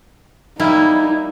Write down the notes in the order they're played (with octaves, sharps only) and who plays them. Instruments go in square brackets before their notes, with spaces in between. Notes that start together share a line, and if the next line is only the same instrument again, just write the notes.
[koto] G3 A#3 E4 [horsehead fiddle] D#4